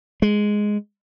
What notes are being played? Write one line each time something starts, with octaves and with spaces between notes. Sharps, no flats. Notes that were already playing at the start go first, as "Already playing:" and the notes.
G#3